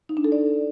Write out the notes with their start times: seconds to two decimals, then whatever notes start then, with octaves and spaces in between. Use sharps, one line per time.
0.09 D#4
0.17 D4
0.24 A4
0.32 D5